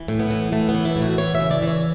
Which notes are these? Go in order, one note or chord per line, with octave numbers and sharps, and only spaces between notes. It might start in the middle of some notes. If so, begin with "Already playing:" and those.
Already playing: E3
A2
B3
E3
A2 A3
B3
E3
E4
A2
F#4
E3 C#5
E5
C#3
D5
E3
C#5